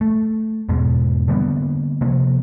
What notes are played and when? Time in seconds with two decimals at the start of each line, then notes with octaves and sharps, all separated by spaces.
0.01 A3
0.69 E2 G#2 B2 G#3
1.28 D3 G3 A#3 B3
2.01 C3 F3 A#3 C4